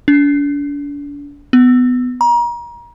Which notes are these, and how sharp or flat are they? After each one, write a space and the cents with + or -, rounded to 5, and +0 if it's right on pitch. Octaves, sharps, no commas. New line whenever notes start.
D4 -40
B3 +15
A#5 +35